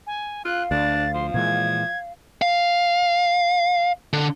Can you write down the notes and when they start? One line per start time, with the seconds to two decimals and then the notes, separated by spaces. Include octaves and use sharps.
0.07 G#5
0.45 F4 F5 F#6
0.71 D2 D4 A6
1.14 F3 C6
1.34 A#2 E3 G#3 G#6
2.42 F5
4.13 D3